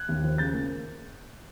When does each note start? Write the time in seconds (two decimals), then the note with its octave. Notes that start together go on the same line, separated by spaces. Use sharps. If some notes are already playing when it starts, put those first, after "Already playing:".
Already playing: F#6 G#6
0.09 D#2
0.23 F3
0.38 C#3 G6 A6
0.53 A#3